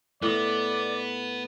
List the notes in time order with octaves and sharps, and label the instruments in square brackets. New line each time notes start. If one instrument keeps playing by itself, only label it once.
[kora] A2 D#5 [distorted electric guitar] B3 [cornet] D5